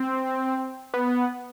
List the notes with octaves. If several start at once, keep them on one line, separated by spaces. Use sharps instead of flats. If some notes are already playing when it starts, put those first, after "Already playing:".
Already playing: C4
B3